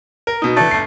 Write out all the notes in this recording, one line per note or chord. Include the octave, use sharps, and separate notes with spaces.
A#4
B2 D#4
E3 A3 D4
G1 C7